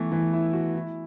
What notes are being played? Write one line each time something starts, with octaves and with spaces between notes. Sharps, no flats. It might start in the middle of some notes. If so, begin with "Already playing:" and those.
Already playing: E3 A3 B3
E3
E4
F#4
E4